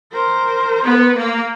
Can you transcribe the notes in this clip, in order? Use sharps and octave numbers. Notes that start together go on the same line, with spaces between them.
A#4 C5
B3
A#3